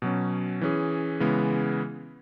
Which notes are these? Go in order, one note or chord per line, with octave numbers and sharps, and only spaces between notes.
B2 F#3 C#4
E3 C#4 G#4
C#3 E3 G#3 B3